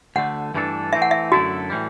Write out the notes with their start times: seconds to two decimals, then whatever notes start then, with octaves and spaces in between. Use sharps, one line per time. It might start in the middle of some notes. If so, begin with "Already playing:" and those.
0.16 D2 D3 A3 F#5
0.55 G2 E3 A3 D4 A4
0.93 E3 A3 C4 E5
1.02 F#5
1.11 E5
1.32 F#2 D3 A3 E4 F#4 A4
1.70 A2 E3 G3